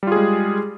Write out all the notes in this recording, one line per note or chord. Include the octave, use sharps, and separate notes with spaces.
G3 G#3 F4 G#4